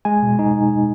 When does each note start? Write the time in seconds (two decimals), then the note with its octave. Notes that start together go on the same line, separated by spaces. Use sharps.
0.05 G#3 G#5
0.23 B2
0.39 D#4